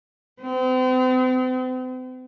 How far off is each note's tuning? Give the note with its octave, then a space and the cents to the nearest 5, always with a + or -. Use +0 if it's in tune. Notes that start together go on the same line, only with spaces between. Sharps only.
C4 -40